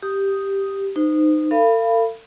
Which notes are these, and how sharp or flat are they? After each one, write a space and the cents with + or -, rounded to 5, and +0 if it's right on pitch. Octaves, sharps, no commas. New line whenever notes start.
G4 +0 D#6 +0
D#4 -20 C5 -30
A4 +45 F5 -30 B5 +0